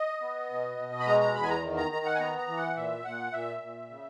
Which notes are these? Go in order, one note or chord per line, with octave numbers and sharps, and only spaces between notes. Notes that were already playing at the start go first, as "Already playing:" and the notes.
Already playing: D#5
B3
B2
B2
B5
G#3 A#5
A#5
E2 B5
G#5
A#5
D#3
A#5
D#3 A#5
F#5
G#5
B3 A#5
A#5
E3
F#5
A#2 E5
A#2 F#5
A#2 E5
A#2
C#3